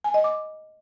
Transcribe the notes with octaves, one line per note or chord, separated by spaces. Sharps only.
G#5
D#5
D6